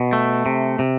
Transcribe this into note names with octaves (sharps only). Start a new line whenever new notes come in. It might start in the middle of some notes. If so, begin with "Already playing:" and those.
Already playing: B2
A3
C3
C3